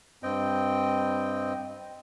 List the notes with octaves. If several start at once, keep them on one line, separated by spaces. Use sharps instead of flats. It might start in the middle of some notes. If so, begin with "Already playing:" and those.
G2 C4 D#5 G5